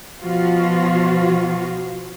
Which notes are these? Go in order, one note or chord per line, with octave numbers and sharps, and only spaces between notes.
B2 F3 F4 F#4